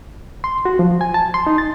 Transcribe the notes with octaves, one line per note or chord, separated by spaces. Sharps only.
C6
F#4
F3
G#5
A5
C6
D#4
A6